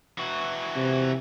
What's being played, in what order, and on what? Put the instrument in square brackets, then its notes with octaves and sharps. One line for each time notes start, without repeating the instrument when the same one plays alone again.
[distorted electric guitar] E3 F#4
[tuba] C3